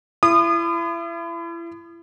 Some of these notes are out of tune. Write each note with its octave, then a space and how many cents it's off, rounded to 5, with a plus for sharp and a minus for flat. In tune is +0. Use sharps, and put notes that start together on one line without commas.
E4 +35 D#6 -35